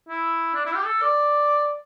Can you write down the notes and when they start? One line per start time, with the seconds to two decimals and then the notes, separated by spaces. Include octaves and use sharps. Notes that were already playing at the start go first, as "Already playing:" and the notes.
0.09 E4
0.54 D4
0.65 E4
0.75 G4
0.85 A4
1.01 D5